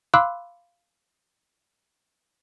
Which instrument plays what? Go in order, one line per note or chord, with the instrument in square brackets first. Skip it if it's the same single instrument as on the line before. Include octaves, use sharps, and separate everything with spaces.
[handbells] F5 B5 C6 D6 E6 F#6